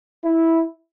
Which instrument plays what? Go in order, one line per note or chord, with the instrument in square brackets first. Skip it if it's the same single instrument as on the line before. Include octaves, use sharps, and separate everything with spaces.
[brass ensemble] E4